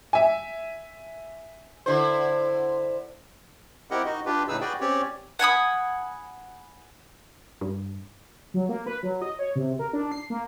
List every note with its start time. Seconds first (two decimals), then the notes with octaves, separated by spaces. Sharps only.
0.13 E5 G#5
1.86 D3 E4 C5
3.91 C4 E4 G4 A#4 D#5 F#5
4.06 D#4 F#4 D#5
4.26 D4 F4 G4 B4
4.48 A2 C#3 D#4 G#4 B4 E6
4.61 F#4 G#4 B4 D5 G5
4.81 C4 C#4 G4 C#5 D5
5.39 F#5 G#5 B5 D#6
7.61 G2
8.54 F#3
8.69 A#3
8.86 B4
9.03 F#3
9.22 D#5
9.39 C#5
9.55 C3
9.79 A#4
9.93 D4
10.12 C7
10.30 A#3